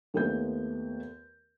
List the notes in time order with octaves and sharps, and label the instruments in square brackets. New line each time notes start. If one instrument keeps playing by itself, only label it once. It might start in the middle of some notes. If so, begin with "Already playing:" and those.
[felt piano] D#2 A3 B3 G6